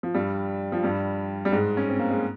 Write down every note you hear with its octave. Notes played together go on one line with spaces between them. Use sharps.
F3
G2 G3
F3
G2 G3
G3
G#2 G#3
C#4
C4
A#3
G#3